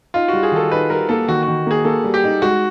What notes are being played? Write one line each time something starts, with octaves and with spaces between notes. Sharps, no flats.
D#4 F4
G3 F#4
G#4
D#3 A4
D#4 B4
G3 A#4
A#3 A4
D#3 F#4
F#4
D#3
A#3 G#4
A#3 A4
G3
G4
D#4
G#3 F#4